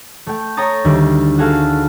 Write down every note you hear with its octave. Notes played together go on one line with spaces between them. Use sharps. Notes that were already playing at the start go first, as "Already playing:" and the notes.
A3 G5
C#5 G5 A#5 D#6 A6
D2 D#3 G3
F#4 G#4 A4 F5